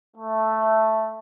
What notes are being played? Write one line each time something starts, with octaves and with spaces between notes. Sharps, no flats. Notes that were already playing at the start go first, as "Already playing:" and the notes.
A3